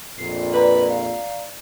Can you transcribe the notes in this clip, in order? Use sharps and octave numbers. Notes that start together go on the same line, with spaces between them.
A#1 F2 A#2 C7
B4 D5 A#5
F5